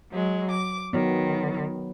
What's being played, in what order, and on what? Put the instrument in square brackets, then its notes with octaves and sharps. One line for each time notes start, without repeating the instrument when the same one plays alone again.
[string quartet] F#3 G#3
D6
[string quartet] D#3 [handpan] F#3 B3